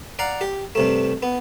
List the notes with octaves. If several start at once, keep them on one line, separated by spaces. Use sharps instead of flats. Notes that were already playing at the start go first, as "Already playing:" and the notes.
D5 F5 F#5 A#5
G4
G2 C3 A3
B3